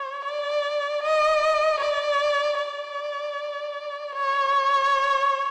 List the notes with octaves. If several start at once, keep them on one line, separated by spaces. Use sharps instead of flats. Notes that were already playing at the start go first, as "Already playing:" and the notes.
Already playing: C#5
D5
D#5
D5
D5
C#5